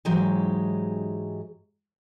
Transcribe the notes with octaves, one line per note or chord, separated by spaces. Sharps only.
G#2 E3 F#3 G#3 D#4 G4